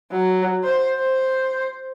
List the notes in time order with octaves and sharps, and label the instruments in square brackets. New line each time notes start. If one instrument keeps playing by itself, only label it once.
[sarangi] F#3
C5
C5